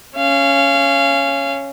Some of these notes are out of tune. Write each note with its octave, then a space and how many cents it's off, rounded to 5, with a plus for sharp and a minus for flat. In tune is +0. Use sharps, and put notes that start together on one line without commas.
C#4 +0 F5 -25